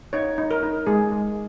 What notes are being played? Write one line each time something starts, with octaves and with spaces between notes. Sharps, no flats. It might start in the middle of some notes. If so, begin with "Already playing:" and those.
D#4 C#5
D#4
A#4
D#4
G#3 G#4
G#3